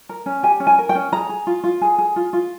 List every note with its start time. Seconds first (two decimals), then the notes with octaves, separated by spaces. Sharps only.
0.09 A#4
0.26 C#4
0.43 G4 G#5
0.60 C#4
0.67 G#5
0.78 A#4
0.89 G5
0.95 C#4
1.12 G#4 A#5
1.29 G#4
1.47 F4
1.64 F4
1.81 G#4
1.98 G#4
2.16 F4
2.33 F4